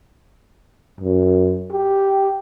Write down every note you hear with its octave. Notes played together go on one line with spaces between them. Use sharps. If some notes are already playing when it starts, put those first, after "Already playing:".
F#2
G4